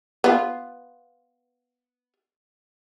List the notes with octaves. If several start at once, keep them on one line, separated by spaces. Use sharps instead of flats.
B3 F4